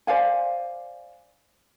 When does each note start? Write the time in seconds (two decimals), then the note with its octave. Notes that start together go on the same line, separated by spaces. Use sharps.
0.07 C5 D5 F5 G#5